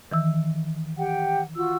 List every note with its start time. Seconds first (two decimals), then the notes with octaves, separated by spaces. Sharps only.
0.12 D#3 E3 E6
0.98 G4 F#5 G5
1.56 F4 F#4 E6